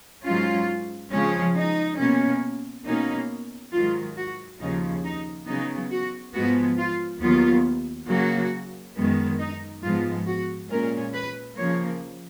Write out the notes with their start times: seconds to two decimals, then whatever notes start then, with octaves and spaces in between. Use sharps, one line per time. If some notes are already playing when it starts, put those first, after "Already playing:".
0.25 G#2 F#3 C#4 F4
1.11 C#3 F3 G#3 C#4
1.55 D#4
1.99 B2 A#3 C#4
2.87 B2 A#3 C#4 D#4
3.73 G#2 D#3 F#3 F4
4.17 F#4
4.61 D#2 C#3 F3 D#4
5.04 D#4
5.47 C#3 F#3 B3 D#4
5.91 F#4
6.34 G#2 F3 G#3 B3 F#4
6.78 F4
7.22 D#2 D#3 F#3 B3 F4
8.08 C#3 F#3 A#3 F#4
8.96 F#2 D#3 G#3 B3
9.39 D#4
9.83 G#2 F3 G#3 B3 F4
10.27 F#4
10.70 A#2 G#3 C#4 A#4
11.14 B4
11.57 C#3 F3 A#3 C#5